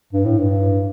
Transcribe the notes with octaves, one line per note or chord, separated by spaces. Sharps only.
G2
A2
G2